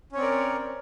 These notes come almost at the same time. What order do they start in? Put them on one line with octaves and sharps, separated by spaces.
C#4 C#5 C4 D5 A#4